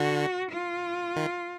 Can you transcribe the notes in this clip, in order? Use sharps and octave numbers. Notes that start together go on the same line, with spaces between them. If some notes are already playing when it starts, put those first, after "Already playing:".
Already playing: D3 F#4
F4
D#3